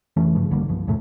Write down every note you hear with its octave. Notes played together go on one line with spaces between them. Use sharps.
F1 E3 A3 C#4
G2 C#3 F3
B1 D3 G3 A#3
C2 G2 F3
E2 A2 C3 A3